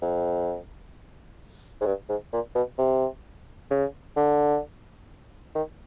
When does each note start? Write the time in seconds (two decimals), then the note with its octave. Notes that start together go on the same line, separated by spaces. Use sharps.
0.02 F2
1.81 G#2
1.86 G2
2.09 G#2
2.33 A#2
2.55 B2
2.78 C3
3.71 C#3
4.16 D3
5.55 D#3